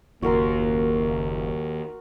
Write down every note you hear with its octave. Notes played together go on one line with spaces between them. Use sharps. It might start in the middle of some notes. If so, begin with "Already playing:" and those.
F#1 D#2 A#3 F#4 A#4 C6